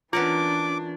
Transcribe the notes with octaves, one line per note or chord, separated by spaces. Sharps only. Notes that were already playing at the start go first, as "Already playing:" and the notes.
E3 B3 C#4 D4 F4 A#4 D6